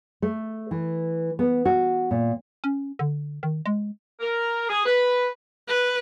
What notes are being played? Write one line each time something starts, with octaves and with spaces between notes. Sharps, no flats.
A3
E3
B3
F#4
A#2
C#4
D3
D#3
G#3
A#4
G#4
B4
B4